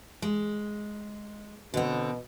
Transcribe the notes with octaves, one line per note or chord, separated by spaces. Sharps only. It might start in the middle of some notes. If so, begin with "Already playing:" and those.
G#3
B2 D3 C4